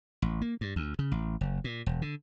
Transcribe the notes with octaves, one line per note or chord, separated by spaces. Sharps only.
A1
A#3
G2
D2
C#3
A1
F#1
A#2
E1
D3